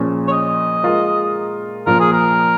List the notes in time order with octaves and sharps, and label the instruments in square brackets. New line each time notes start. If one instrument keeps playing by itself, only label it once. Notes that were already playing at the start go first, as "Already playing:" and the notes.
Already playing: [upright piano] A#2 F3 C#4 G#4
[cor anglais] C#5
D#5
[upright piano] G#3 F4 A#4
[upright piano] A#2 F3 A#3 F4 [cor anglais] A#4
[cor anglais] G#4
A#4